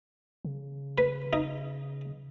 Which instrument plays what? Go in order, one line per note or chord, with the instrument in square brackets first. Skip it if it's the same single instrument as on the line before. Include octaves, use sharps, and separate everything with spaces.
[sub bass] C#3
[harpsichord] B4
D#4